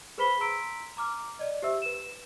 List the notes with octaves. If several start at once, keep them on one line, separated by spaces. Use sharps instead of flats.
G#4 B4 C5 B5 B6 G7
A#5 C6 E6 B6 D7
A#5 D6 F6
D5 D#5
G4 C5 E5 E6
B4 E7